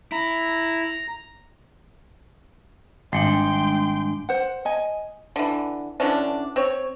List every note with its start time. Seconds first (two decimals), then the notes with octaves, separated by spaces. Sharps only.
0.12 E4 A#5
3.13 G#1 G3 G#3 D4 G5 C6
4.29 C5 F#5
4.65 D#5 G#5
5.36 D3 E3
6.00 D3 E3 C#4 D4
6.56 C4 C#5